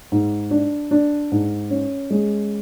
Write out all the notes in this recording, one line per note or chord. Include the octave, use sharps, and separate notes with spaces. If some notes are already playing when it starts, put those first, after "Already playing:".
G#2
D4
D4
G#2
C#4
G#3